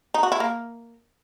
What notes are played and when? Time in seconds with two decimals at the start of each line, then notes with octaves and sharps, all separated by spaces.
0.14 D#4
0.23 F#4
0.32 E4
0.40 A#3